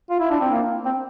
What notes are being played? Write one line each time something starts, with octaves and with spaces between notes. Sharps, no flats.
F4
E4
D4
C4
A#3
C4